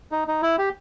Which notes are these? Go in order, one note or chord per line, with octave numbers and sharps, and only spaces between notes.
D#4
D#4
E4
G4